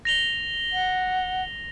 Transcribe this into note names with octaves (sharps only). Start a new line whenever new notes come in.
A#6 F7 G7
F#5